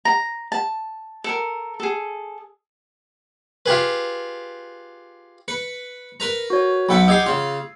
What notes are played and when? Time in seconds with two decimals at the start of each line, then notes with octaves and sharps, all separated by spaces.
0.05 A#5
0.52 A5
1.24 A4 A#4
1.80 G#4 A4
3.66 F4 G4 G#4 B4
5.48 B4 C#7
6.20 A#4 B4 A#5
6.50 F#4 C#5
6.89 B1 A4 B4 F#5 G5 B5
7.08 D#4 G4 G#5 E6 G#6 C7
7.26 C#3 F4